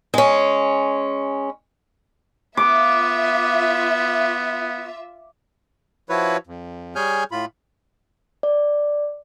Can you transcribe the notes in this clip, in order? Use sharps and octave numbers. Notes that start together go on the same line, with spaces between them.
G#3 C#4
B3 F4 E5 D6
F3 E4 F#4 B4 C#5
F2
G3 G#4 C#5 G#5 F6 G6
A2 F4 B5
D5